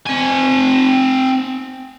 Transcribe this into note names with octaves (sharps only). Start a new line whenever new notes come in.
C4 G#5